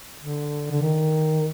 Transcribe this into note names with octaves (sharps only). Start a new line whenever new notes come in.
D3
D3
D#3